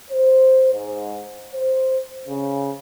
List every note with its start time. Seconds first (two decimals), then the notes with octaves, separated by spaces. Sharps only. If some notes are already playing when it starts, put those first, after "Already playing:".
0.11 C5
0.74 G#2
1.53 C5
2.28 C#3